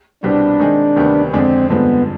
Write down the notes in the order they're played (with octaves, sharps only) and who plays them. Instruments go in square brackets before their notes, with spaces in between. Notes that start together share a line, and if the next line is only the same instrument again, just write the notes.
[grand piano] C2 B2 G3 C4 G4 [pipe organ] D4
[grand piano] D#3 G#3 C4 D#4 G#4
D2 C3 D#3 G3 B3
[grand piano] F2 D3 G#3 D4 G#4 [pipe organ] C4
[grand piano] G2 D3 F3 G#3 C4 [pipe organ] B3